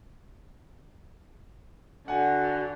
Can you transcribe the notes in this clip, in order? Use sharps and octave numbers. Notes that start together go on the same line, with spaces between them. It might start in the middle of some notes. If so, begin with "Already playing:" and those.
D3 F#4 F#5 G#5